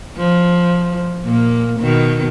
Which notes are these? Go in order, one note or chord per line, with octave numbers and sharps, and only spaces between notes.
F3
A#2 A#3
B2 D#3